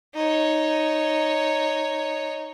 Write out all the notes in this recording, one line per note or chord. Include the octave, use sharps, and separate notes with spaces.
D#4 C#5